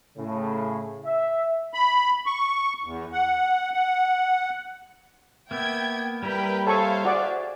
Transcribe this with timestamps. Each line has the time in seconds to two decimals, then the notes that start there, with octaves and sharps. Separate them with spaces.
0.18 A2 C#3
1.04 E5
1.74 B5
2.26 C#6
2.84 E2
3.13 F#5
3.74 F#5
5.51 A#3 B3 E5 G5 G#6
6.23 G3 A#3 E4 A#4 B4 G5 B5
6.67 A4 C5 C#5 E5 F5 G#5 C#6
7.05 F#4 G#4 D5